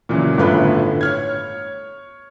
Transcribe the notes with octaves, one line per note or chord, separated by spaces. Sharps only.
A#2 C#3 E3 F#3
G1 A2 D3 F4 B4 B5
C#5 F6 G#6